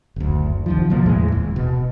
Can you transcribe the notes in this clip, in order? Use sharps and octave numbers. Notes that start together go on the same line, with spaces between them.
F#1 D2
C2 D#3 F3
B2 D3 F3 A#3
E2 A2 E3 G#3
D#1
B2